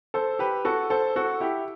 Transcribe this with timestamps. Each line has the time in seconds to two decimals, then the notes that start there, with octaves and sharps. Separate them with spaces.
0.14 A4 C5
0.39 G4 B4
0.65 F#4 A4
0.90 A4 C5
1.16 F#4 A4
1.40 E4 G4